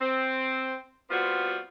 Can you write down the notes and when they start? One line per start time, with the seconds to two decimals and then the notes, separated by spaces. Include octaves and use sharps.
0.01 C4
1.10 G3 B3 C4 F4 F#4